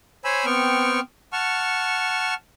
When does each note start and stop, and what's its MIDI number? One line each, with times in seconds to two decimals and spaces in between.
0.24 0.46 72
0.24 0.46 73
0.24 0.46 80
0.24 0.46 83
0.24 0.46 88
0.46 1.00 59
0.46 1.00 60
0.46 1.00 79
0.46 1.00 85
0.46 1.00 89
1.33 2.34 78
1.33 2.34 81
1.33 2.34 85
1.33 2.34 89